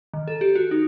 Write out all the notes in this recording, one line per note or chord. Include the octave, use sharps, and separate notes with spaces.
D#3
A4
G4
F#4
D#4